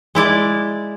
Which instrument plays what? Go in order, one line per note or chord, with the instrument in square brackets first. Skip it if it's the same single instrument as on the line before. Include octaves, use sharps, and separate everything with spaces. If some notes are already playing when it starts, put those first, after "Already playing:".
[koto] G#3 E4 D5